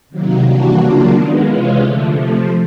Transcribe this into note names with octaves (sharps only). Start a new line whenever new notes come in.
C3 D#3 F#3 A#3
E3 G3 A#3 D4 F#4
C#3 F#3 A#3 D4 F4
D#3 G#3 B3
C3 E3 G#3 C#4 F4
D3 F3 A3
C3 F3 A3